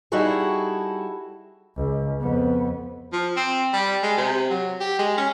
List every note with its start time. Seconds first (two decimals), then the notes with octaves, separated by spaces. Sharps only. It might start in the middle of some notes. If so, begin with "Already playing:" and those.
0.12 G3 D#4 E4 F#4 G#4 A4
1.76 C#2
2.20 F2 B3
3.12 F3
3.36 C4
3.73 G3
4.03 G#3
4.17 C3
4.50 F#3
4.80 G4
4.99 G#3
5.17 C#4